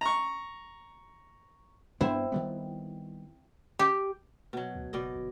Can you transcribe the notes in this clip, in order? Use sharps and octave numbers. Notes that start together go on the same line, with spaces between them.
A#5 C#6
G2 B3 C4 D4 E4
D#3 G3 B3
G4
B2 F#3
D2
F#1 B2 D5 D#5
G1